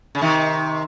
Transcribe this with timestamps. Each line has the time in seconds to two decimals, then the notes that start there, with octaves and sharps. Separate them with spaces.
0.15 C#3
0.21 C3 D#3